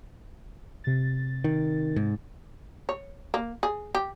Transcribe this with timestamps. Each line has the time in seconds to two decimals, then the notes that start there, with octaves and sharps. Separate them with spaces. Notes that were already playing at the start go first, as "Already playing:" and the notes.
0.84 C3 A6
1.44 D#3
1.96 G#2
2.89 C#5
3.34 A#3
3.63 G#4
3.95 G4